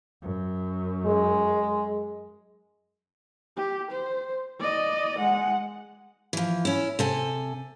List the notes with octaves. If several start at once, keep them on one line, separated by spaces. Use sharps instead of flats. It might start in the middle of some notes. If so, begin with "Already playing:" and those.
F#2
G#3
G4
C5
D5 D#5
G#3 F#5
E3 F3
C#4 E4
C3 A4 G#5